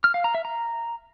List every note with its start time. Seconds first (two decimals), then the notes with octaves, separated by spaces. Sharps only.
0.04 F6
0.14 F5
0.24 A#5
0.35 E5
0.45 A#5